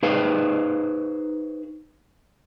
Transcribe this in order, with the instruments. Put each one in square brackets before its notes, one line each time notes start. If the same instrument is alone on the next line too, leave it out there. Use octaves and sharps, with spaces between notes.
[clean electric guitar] D#4 G#4 B4 C5 F5